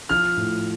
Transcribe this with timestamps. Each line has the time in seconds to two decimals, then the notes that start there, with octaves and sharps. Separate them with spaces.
0.09 F3 F6
0.37 A2